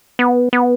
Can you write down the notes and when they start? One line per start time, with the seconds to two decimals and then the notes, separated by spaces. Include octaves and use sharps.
0.19 B3
0.53 B3